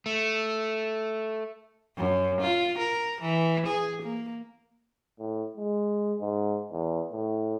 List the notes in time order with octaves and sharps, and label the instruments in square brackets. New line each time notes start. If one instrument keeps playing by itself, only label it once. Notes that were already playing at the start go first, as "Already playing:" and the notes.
[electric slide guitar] A3
[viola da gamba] F#2
F4
A#4
E3
G#4
A#3
[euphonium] A2
G#3
G#2
E2
A2